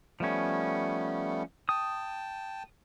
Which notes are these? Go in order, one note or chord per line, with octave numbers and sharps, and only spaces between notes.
F3 G3 A3 B3 C#4
G5 A5 D#6